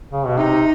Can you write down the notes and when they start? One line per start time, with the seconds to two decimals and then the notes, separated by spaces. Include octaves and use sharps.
0.12 C#3
0.26 B2
0.38 C3 D#4